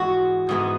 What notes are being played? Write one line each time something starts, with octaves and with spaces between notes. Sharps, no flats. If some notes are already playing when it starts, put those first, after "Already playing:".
Already playing: G#2 E3 G#3 B3 F#4
G#2 E3 G#3 B3